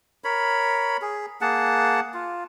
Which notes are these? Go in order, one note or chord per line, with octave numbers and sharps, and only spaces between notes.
A#4 C#5 B5
G#4
A#3 G#4 F#5 A5
F4